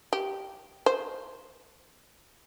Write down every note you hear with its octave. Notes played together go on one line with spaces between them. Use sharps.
G4
C5